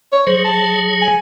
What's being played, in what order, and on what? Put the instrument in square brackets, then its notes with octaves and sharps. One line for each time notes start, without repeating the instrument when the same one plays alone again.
[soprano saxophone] C#5
[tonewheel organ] F#3 G#4 [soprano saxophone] C5
[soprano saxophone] A5
G#5